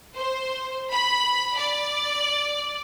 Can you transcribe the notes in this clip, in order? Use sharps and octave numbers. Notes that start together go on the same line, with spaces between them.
C5
B5
D5